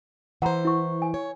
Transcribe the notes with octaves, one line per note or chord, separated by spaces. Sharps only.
E3 C5 F#5 A#5 B5
E4 C#6
G#5
C#5